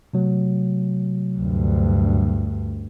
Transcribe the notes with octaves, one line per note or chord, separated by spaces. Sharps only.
C3 F#3 A3
D2 G2